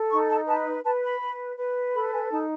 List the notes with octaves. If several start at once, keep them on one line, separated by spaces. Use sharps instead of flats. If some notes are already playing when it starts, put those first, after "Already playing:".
Already playing: A4
D#4 C#6
A5
B4 A5
B4 A5
B5
B4
B4
A4 B5
G#5
D#4 A5